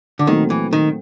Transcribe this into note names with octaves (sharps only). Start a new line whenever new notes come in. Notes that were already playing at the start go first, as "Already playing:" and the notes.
D3
A#2 D#3 F#3 A3 C4
E3
D#3